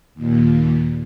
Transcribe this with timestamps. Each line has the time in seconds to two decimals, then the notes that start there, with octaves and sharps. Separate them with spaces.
0.14 D#2 A#2